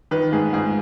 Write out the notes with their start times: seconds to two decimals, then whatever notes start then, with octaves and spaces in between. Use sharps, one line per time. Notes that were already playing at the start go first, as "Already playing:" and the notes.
0.11 D#3 B4
0.32 G#2 G#4
0.53 G#2 G#4